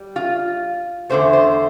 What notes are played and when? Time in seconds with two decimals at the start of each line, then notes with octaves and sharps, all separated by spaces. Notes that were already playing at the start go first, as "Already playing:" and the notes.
Already playing: G3
0.16 F4
1.09 E2 D3 A3 C5
1.33 C5